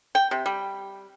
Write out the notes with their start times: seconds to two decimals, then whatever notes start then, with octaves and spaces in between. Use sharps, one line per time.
0.15 G5
0.31 C3
0.46 G3